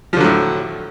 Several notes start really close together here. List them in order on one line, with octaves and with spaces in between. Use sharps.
F3 D3 F#3 A2